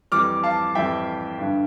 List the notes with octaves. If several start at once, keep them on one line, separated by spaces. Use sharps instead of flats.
F2 E3 G3 D6 F6
F5 A5
F2 E3 G3 E5 G5
G2 D3 G3